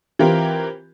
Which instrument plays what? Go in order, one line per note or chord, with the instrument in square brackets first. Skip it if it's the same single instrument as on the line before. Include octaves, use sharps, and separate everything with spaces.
[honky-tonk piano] E3 C4 F4 G4 A#4